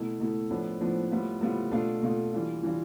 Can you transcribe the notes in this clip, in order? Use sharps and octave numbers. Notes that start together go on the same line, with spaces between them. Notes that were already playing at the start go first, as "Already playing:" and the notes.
Already playing: B2 A3 E4
B2 A3 E4
A2 F3 B3 D4
A2 F3 B3 D4
A2 G3 B3 F4
A2 G3 B3 F4
B2 A3 D4 F4
B2 A3 D4 F4
E3 G3 D4 F4
E3 G3 D4 F4